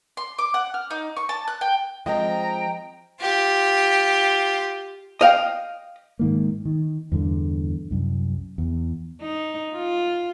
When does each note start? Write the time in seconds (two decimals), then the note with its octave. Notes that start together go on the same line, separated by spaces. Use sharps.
0.17 C6
0.38 D6
0.54 F#5
0.74 F6
0.91 D#4
1.16 C#6
1.29 A5
1.48 F#6
1.61 G5
2.06 F3 G#3 C4 D#5 G5 A#5
3.21 F4 G4
5.21 D#5 F5 G5
6.19 G#2 D#3 A#3
6.65 D#3
7.12 E2 G2 D3
7.91 C2 F#2
8.58 E2
9.21 D#4
9.71 F4